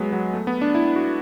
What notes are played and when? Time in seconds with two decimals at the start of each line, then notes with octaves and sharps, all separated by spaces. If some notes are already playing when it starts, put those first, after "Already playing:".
Already playing: F#3 G#3 B3
0.13 F#3
0.34 A3
0.47 B3
0.61 D4
0.75 E4
0.96 F#4